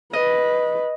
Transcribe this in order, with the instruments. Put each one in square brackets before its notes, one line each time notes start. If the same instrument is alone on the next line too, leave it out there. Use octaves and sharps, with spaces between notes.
[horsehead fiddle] B4 [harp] D#5